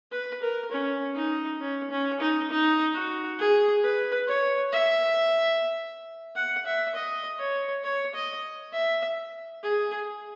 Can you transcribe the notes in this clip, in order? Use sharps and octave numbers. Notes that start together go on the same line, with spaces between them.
B4
A#4
C#4
D#4
C#4
C#4
D#4
D#4
F#4
G#4
B4
C#5
E5
F#5
E5
D#5
C#5
C#5
D#5
E5
G#4